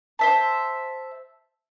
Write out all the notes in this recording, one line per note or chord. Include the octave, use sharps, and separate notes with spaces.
C5 E5 A5